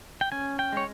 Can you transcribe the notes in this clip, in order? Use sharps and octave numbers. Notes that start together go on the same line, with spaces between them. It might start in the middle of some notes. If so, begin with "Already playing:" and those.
G5
C#4 G#5
G5
G#3 C#5